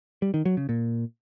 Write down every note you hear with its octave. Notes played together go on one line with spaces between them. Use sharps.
G3
D#3
F#3
C#3
A#2